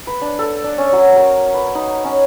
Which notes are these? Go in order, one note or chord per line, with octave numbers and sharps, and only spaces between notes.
B4
D4
A4
D4
C#4
F#3
A#4
B4
D#4
C#4